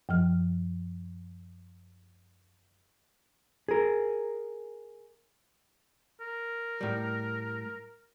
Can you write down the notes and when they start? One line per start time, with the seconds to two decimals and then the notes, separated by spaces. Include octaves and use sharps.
0.09 F#2 F3 F6
3.68 G#4 A#4
6.21 A#4
6.81 A2 G3